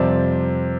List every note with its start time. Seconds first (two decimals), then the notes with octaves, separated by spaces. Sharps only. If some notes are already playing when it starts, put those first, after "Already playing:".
Already playing: F2 C3 G3 C4 D5